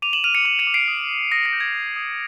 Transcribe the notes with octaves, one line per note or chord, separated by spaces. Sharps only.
D6 D#7 F7
E7 F#7
F6 D#7 F7
C#7 D#7
D6 C#7 D#7
C#7 D#7
D6
C7 D7
D#6
D#6
D#6 A#6
A#6
G6
G#6
D#6
D#6